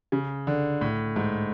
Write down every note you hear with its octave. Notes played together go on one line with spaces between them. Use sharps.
C#3
D3
A2
G#2